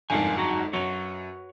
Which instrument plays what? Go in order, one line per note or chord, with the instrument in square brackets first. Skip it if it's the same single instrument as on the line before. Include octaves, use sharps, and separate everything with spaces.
[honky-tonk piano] G1 F2 G#2 [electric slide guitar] A#4 F5 G#5
[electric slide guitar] F#3 F#4 A#5
[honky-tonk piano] F#2 F7 [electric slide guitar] F#4 B4 C#5